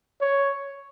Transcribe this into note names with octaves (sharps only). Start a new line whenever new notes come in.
C#5